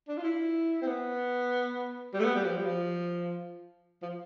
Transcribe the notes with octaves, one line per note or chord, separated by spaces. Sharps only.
D4
F4
E4
C4
B3
G3
A3
B3
G3
F3
G3
F3
F3